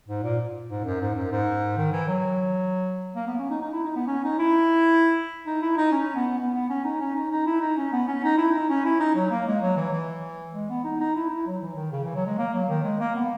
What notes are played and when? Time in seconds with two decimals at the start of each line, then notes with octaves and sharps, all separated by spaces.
0.09 G#2
0.23 A#2
0.70 G#2
0.85 F#2
1.01 G#2
1.15 F#2
1.31 G#2
1.77 D#3
1.93 E3
2.08 F#3
3.16 A#3
3.27 B3
3.39 C#4
3.50 D#4
3.62 D#4
3.73 E4
3.85 D#4
3.96 B3
4.07 C#4
4.24 D#4
4.39 E4
5.47 D#4
5.62 E4
5.77 D#4
5.92 C#4
6.16 B3
6.39 B3
6.54 B3
6.70 C#4
6.84 D#4
7.01 C#4
7.15 D#4
7.31 D#4
7.47 E4
7.61 D#4
7.77 C#4
7.93 B3
8.08 C#4
8.24 D#4
8.38 E4
8.55 D#4
8.69 C#4
8.85 E4
9.00 D#4
9.16 F#3
9.31 A#3
9.47 G#3
9.62 F#3
9.77 E3
9.92 E3
10.54 G#3
10.70 B3
10.85 D#4
11.01 D#4
11.16 E4
11.30 E4
11.46 F#3
11.61 E3
11.76 D#3
11.92 C#3
12.04 E3
12.15 F#3
12.26 G#3
12.38 A#3
12.54 F#3
12.69 D#3
12.84 G#3
13.00 A#3
13.15 B3